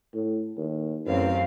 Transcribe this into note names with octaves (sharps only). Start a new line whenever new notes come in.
A2
D#2
A1 F#2 C4 F5